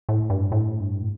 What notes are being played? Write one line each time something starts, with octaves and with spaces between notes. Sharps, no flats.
A2
G2
A2
G2
A2